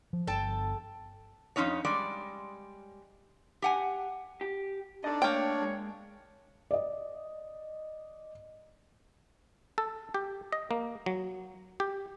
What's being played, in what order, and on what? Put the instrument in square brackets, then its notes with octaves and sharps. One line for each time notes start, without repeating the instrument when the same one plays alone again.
[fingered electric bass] F3
[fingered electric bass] G1 [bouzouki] A4 G5 A5
[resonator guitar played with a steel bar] F2 G#2 C#4 D#4 C#5
G3 G#3 D5
G4 F#5 G#5
[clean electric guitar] G4
[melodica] D4 [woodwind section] D#4 D5 A5 [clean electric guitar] A4 D#5
[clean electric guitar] A3 A5 [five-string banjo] A#3 G5 [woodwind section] C#5
[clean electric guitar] G#3
[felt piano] D5 D#5
[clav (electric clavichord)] A4
G4
D#5
A#3
F#3
G4